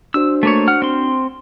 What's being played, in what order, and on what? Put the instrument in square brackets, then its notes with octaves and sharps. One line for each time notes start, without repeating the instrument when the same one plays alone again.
[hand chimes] D4 F#4 C5 [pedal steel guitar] E6
[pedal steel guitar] A3 A#3 C#5
F#5 F6
C4 C6